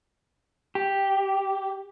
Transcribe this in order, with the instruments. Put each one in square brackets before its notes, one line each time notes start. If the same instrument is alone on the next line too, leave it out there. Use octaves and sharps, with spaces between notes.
[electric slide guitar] G4